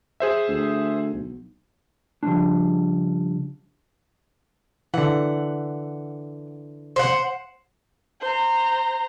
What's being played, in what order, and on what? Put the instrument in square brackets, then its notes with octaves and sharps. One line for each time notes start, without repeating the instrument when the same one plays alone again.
[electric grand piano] G#4 C5 E5
[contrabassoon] D2
B1
[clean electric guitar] C#3 F3 G3 A#3 C#4 D4
[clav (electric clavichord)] D3 E3 [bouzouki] F#5
[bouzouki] C5 D5 F#5
[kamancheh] C5 A#5